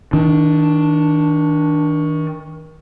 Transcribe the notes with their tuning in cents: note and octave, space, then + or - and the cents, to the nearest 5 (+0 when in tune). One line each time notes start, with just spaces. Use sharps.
D#3 +35 D4 +0